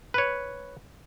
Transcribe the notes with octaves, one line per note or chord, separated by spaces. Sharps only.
B4 C#5